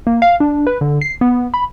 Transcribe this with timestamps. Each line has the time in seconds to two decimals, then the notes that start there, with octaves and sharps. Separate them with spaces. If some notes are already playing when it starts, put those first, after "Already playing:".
0.07 A#3
0.22 F5
0.40 D4
0.67 B4
0.81 D3
1.01 C7
1.21 B3
1.54 B5